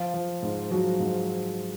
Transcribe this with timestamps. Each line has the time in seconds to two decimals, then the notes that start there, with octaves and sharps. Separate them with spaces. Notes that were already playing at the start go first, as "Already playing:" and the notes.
Already playing: F3 F4
0.14 F3
0.42 G#2
0.71 F3 F#3 F#4
1.00 G#2